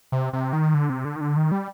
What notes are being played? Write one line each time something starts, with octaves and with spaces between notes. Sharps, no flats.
C3
C3
D#3
D3
C3
D3
D#3
D3
D#3
G3